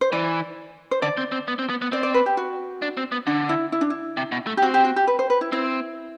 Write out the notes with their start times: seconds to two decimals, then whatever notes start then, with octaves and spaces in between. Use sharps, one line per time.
0.01 C5
0.12 E3 D5
0.91 C5
1.02 D3 D5
1.17 C4
1.32 C4
1.48 B3
1.59 C4
1.69 B3
1.82 B3
1.92 C4 D5
2.03 D5
2.14 B4
2.26 G4
2.37 F#4
2.82 D4
2.97 C4
3.12 B3
3.27 D3 D4
3.49 E4
3.72 E4
3.81 D4
3.90 E4
4.17 C3
4.32 B2
4.47 A3
4.57 G4
4.63 C4 F#4
4.74 G4
4.85 F#4
4.96 G4
5.07 B4
5.19 C5
5.30 B4
5.41 E4
5.52 C4 E4